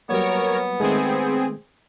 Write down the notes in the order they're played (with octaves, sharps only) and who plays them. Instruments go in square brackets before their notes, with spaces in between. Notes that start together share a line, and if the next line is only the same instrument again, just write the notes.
[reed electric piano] F#3 G3 A#3 [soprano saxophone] B3 [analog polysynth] A#4 C#5
[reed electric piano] D#3 G#3 A3 [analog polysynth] C4 G#4